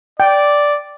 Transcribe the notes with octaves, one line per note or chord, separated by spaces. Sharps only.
D5 G5